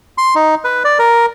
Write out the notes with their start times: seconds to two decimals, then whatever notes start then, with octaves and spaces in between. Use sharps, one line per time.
0.18 C6
0.35 D#4
0.64 B4
0.84 D5
0.99 A#4